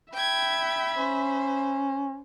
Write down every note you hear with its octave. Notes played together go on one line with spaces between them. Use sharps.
E5 G5 B5 G#6
C#4 C5